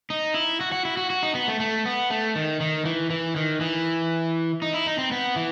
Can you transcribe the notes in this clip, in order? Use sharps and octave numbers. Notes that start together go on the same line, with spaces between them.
D#4
E4
F#4
F#4
E4
F#4
F#4
D#4
B3
A3
A3
B3
A3
D#3
D#3
E3
E3
D#3
E3
D#4
E4
D#4
C4
B3
E3